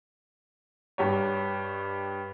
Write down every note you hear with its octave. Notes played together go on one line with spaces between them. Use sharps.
G2 G4 C#5